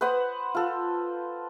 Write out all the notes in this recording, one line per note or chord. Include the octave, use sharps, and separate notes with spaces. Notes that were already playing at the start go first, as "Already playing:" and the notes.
B4 C5 F#5 D#6
F4 A4